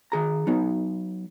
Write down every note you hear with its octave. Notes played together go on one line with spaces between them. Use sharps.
D#3 G#4 A#5
F#3 B3 D#4